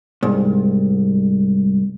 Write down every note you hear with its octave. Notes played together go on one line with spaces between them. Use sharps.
C2 G#2